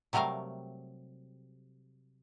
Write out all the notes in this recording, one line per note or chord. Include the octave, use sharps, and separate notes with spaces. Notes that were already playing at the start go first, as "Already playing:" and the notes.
C3 F#3 G3 A3 A#4 F5